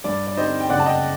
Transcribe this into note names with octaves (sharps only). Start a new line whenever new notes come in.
G2 D5
D5
D3 G3 C4 D#4 C5 D#5
G5
F#1 D5 F#5
A5
D#5 G5